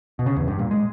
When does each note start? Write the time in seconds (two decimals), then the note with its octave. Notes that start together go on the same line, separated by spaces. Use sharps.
0.19 B2
0.26 C#3
0.36 E2
0.48 G2
0.59 A#2
0.71 G#3